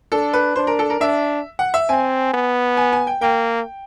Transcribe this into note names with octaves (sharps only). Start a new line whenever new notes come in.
D4 A4
B4
D4 C5
A#4
A4
A#4
D4 E5
F#5
E5
C4 G#5
B3
G#5
G#5
G5
A#3 G5